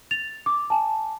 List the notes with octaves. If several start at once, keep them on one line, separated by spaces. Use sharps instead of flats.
A6 F7
D6
G#5 A5